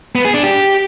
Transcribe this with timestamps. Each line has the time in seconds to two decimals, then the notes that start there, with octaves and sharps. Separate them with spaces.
0.15 B3
0.25 G#4
0.34 D4
0.43 G4